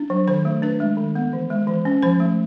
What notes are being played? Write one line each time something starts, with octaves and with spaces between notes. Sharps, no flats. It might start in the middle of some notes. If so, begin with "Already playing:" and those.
Already playing: D4
F#3
D#3 C5
A3
D4 B4
G#3
D#3
B3
E3
G#3
E3
C#4
F3 C5
A3